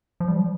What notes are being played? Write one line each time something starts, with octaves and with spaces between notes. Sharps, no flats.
F3
G3
F3